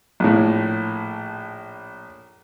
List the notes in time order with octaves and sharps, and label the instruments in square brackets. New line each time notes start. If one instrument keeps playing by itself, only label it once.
[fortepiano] A#1 A2